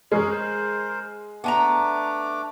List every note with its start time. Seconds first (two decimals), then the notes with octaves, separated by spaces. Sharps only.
0.12 G#3 C#4 G#4 A#4
0.31 A#4 C5
1.44 A3 B3 D4 G#5 A#5 D6